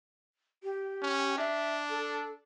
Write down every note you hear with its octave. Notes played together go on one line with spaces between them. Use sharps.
G4
C#4
D4 E5
A4